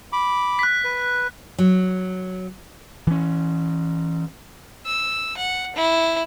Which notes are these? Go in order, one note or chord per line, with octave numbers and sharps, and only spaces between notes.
B5 D6
F#6 B6
B4
F#3
E3 C#4
E6
F#5
E4